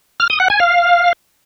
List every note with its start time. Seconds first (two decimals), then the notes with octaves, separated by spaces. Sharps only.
0.20 F6
0.30 D#6
0.40 F#5
0.50 G#5
0.60 F5